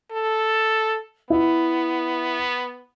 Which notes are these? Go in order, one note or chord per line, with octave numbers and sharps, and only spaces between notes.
A4
B3 E4